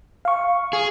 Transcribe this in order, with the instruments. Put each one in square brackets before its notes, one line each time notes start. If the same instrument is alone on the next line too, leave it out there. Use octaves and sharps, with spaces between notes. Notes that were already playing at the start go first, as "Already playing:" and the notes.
[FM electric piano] F5 C#6
[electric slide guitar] G#4